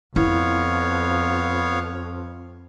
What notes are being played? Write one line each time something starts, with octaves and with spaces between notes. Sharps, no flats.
F2 B3 E4 C#5 F5